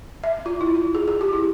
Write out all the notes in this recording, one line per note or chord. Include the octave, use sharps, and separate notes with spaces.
E5
F4
E4
F4
G#4
G#4
G4
E4